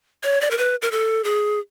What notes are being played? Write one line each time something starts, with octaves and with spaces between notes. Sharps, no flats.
C#5
D5
A#4
B4
A#4
A4
G#4